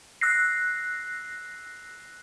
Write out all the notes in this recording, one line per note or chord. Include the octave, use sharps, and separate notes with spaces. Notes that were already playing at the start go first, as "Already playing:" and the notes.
E6 F#6 A#6 C7